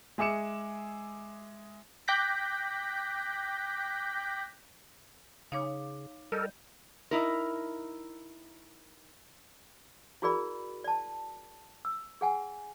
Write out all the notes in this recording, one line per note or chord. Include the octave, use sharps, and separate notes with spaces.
G#3 G#4 E5 D6 C#7 E7
G5 D6 F#6 G6 A#6 B6
C#3 D#4 C#5 F5 D6
G3 A4 A#4 D#5 G6
D#4 E4 A#4
E4 F#4 G#4 A#4 D5 B5
D5 A5
E6
G#4 F#5 G#5